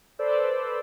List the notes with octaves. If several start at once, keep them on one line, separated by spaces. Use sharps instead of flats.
A4 B4 C5 D5 E6